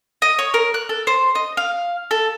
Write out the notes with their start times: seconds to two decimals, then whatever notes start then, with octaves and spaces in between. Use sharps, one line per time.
0.22 D#5
0.39 C#5
0.54 A#4
0.74 F#6
0.89 A4
1.07 C5
1.35 D#5
1.57 F5
2.11 A4